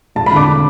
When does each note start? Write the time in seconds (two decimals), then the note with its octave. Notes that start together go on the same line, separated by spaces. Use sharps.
0.15 E1 A5
0.26 B5
0.32 D3 D6